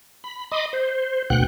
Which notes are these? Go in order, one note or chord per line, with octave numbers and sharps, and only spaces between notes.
B5
D#5 B5 C6 D6 D#6
C5
D2 B2 F#5 G5 F#6